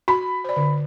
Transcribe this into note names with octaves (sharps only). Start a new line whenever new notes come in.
F#4 B5 C6
C5 D5
D3